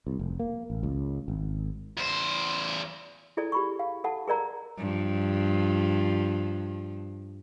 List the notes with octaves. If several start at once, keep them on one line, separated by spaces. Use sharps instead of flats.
C2
F1
A#3
A1
C#2
G#1
E2 C5
E4 G#4 A4 D5
G4 B5 C#6
F5
A4 F#5 A5
G#4 A#4 D5 A#5
G2 F3